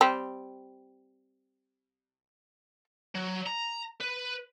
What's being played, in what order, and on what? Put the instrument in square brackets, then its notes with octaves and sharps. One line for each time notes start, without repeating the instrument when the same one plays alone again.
[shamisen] G3 C4
[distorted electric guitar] F#3
A#5
B4